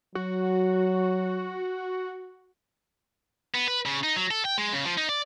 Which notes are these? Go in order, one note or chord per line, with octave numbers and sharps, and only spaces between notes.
F#3 F#4
B3
B4
C#3
D#4
F#3
A4
G5
G#3
C#3
F3
D#4
D5